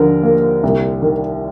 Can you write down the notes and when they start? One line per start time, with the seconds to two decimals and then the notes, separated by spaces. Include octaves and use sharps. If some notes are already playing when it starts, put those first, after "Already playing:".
Already playing: D#2 D3 F3 A#4
0.23 A#3
0.63 C2
1.02 D#3